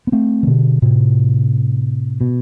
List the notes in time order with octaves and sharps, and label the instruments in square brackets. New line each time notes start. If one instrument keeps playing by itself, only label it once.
[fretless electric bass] B3
A3 C4
E3
B2 D3
A2 C3
B2